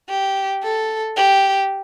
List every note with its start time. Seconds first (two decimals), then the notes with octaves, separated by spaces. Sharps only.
0.09 G4
0.63 A4
1.16 G4